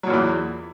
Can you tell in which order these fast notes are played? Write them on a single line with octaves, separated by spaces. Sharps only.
F#3 A#2 E3 E2